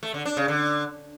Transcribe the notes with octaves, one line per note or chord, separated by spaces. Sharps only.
A3
D3
D4
C#3
D3